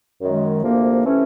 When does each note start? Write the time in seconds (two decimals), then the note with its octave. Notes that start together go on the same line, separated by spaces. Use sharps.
0.21 F#2 D#3 G#3
0.63 D2 C3 F3 A#3
1.05 C3 E3 A3 C#4